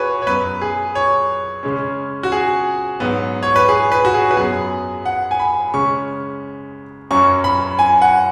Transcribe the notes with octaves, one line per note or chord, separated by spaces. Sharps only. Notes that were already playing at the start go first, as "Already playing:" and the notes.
Already playing: F#4 G#4 B4 C#5
C#5
F#2 F#3 B3 B4
G#4
C#5
C#3 G#3 C#4
F#4
G#4
G#2 F#3 B3
C#5
B4
G#4
B4
F#4
G#4
B4
F#2 F#3 B3 G#4
F#5
G#5
B5
C#3 G#3 C#4 C#6
F#2 F#3 C#4 C#6
B5
G#5
F#5